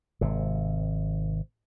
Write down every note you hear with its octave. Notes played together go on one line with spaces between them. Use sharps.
G#1 C3